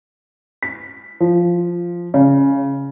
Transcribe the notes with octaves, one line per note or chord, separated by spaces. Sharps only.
B6
F3
C#3